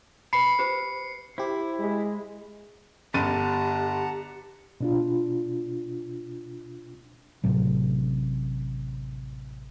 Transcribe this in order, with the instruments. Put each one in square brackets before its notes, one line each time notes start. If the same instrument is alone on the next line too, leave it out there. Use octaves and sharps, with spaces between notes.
[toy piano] B4 B5 [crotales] C7 C#7
[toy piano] G4 B4 C5
[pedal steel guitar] E4 [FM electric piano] G4 C5
[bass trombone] G#3
[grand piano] G1 A6 D#7 [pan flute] G4 [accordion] F#5 A5 A#5
[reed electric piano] B2 D4 F4
[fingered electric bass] A1 A2 C3 F#3